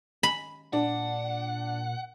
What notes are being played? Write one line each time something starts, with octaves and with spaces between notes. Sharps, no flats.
B5
A#2 D4 F#5